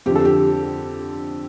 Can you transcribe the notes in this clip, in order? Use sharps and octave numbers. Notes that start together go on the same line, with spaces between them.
F2 D3 G4
A4
G4